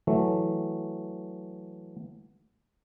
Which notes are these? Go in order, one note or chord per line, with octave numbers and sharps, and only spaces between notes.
E3 F#3 A3